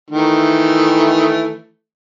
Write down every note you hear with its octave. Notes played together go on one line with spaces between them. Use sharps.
D#3 E3 A3